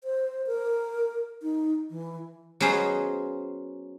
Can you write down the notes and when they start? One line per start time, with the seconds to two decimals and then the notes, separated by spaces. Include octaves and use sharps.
0.04 C5
0.47 A#4
1.43 D#4
1.90 E3
2.60 F#3 B3 C#4 G#4 C5 D#5